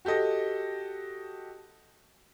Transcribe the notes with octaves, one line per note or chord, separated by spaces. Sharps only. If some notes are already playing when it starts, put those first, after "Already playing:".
F#4 G4 A4 D#5